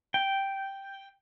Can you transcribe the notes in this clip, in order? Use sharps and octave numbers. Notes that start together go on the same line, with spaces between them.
G5